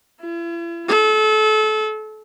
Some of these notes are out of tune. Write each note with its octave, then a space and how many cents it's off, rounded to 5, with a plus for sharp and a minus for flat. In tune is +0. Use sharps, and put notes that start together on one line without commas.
E4 +45
A4 -30